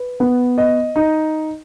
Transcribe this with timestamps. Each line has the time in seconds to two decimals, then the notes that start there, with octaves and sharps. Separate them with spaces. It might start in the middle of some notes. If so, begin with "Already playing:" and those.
Already playing: B4
0.20 B3
0.58 D#5
0.96 D#4